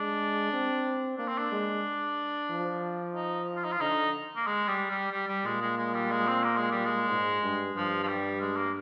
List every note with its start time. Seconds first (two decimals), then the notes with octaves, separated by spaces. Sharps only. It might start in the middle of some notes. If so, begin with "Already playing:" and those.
Already playing: G#3 D4
0.53 C4
1.18 A#3 D4
1.28 C4
1.38 D4
1.51 G#3
2.50 F3
3.15 D#4
3.56 F4
3.64 D#4
3.72 F4
3.80 D3 D#4
4.36 A#3
4.46 G#3
4.68 G3
4.90 G3
5.12 G3
5.28 G3
5.44 A#2 G#3
5.62 G#3
5.78 G#3
5.94 G3
6.11 G#3
6.27 C4
6.44 A#3
6.57 G#3
6.71 G3
6.85 G#3
7.09 G#2
7.42 G2
7.74 G2 F3
8.03 F3
8.08 G3
8.41 G#3
8.57 A#3